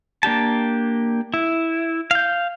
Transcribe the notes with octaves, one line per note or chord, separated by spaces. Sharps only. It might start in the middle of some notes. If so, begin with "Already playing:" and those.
A#3 D4 G4 A5
E4
F5 G6